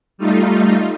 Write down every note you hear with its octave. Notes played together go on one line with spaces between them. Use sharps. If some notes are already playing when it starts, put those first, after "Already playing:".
G3 A3 D#4 F4